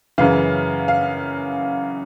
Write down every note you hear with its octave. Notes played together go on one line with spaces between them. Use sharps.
F#2 C#3 E3 F5
F5